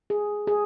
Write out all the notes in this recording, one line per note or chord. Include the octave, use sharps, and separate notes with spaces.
G#4
G#4